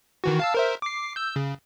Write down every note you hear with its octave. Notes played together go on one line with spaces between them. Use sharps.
D#3 E3 F#4
F5 A5 E6
A#4 C5 E5
D6 C7
E6 G6
C#3